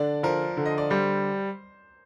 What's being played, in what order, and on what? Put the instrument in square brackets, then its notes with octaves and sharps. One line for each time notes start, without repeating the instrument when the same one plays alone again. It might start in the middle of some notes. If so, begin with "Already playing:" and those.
Already playing: [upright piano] D3 [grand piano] D4 D5
[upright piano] F3 [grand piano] A#4
[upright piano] D3
[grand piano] D#5
D5
[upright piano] G3 [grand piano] C5